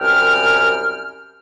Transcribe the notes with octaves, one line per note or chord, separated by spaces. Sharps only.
C2 F#2 G5 F6